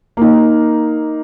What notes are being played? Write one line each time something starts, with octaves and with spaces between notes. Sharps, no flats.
A#3 D#4